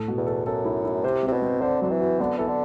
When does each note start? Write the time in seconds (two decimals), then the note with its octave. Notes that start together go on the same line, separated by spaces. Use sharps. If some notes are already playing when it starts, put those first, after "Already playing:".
Already playing: A2 A4
0.08 B2
0.18 E2
0.26 A4
0.46 F#2 A4
0.65 E4
0.84 E4
1.04 C3 C5
1.23 C4
1.28 C3
1.33 B2
1.42 C4
1.62 D3 C5
1.81 D3 F#3
1.91 E3
2.00 F#4
2.20 D3 B3
2.38 E3 A4
2.49 D3